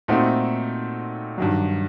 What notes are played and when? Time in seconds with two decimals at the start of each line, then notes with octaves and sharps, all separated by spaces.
0.08 A#2 A3 C4 D#4 F#4
1.38 G2 D#3 F#3